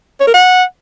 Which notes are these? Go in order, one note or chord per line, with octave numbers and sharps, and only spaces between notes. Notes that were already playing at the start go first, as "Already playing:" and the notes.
C#5
A#4
F#5